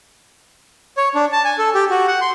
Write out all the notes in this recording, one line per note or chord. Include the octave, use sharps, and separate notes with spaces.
C#5
D4
A5
G#5
A4
G4
F#4
F#5
C6